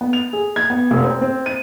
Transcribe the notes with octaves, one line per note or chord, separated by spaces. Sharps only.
B3
F7
G#4
G#6
B3
F1
C4
C4
D#7